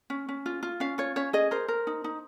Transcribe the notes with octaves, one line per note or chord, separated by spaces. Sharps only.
C#4
C#4
F4
F4
C#4 F5
F4 C#5
C#4 C#5
G#4 D#5
A#4 C5
A#4
D#4
D#4